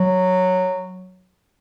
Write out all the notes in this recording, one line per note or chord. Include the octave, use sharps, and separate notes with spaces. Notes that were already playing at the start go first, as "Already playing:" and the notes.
Already playing: F#3